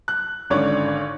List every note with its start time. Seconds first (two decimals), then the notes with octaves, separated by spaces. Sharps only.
0.08 F#6
0.50 G#1 D3 C#4 C#5 D5